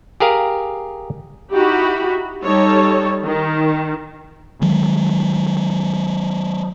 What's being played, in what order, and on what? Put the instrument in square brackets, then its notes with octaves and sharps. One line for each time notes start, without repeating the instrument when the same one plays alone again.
[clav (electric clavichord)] G4 G#4 A#4 F5
[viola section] D#4 E4 F#4 G4 B5
G3 D#4 A4 C#5
D#3
[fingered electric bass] D#3 F#3 G#3